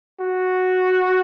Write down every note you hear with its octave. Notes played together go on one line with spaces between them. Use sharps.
F#4